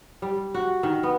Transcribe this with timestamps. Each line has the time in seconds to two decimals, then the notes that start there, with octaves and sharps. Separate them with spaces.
0.22 G3
0.54 F#4
0.83 D#3
1.03 B3